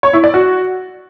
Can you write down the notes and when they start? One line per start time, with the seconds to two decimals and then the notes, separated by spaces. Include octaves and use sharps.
0.03 C#5
0.13 E4
0.24 D5
0.34 F#4